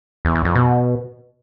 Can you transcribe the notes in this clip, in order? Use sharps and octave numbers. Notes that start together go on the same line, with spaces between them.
E2
E2
F2
B2